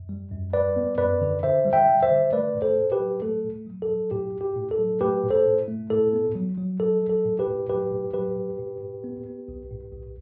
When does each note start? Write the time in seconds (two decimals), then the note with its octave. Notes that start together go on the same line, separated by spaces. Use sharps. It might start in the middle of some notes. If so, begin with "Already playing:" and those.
Already playing: F#2
0.09 G3
0.31 F#2
0.53 G3 B4 D5
0.76 B3
0.98 F#2 B4 D5
1.21 D3
1.43 D3 C5 E5
1.65 G3
1.73 E5 G5
1.88 G3
2.03 C5 E5
2.11 D3
2.32 A3 B4 D5
2.54 A2
2.62 A4 C5
2.78 A2
2.92 G4 B4
3.00 F#3
3.22 A3 A4
3.44 A2
3.67 F#3
3.82 A4
3.89 F#3
4.11 A2 G4
4.33 A2
4.41 G4
4.56 A2
4.71 A4
4.79 F#3
5.01 A3 G4 B4
5.23 A2
5.30 A4 C5
5.46 A2
5.68 A3
5.90 A2 A4
6.13 B3
6.35 F#3
6.58 F#3
6.80 F#3 A4
7.03 F#3
7.09 A4
7.25 A2
7.39 G4 B4
7.47 A2
7.69 F#3 G4 B4
7.92 A2
8.14 F#3 G4 B4
8.36 A2
8.59 A2
8.80 A2
9.04 B3
9.26 B3
9.48 B1
9.71 A2
9.92 B1